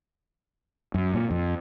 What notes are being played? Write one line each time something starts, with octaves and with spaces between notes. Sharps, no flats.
F#2
A#2
F2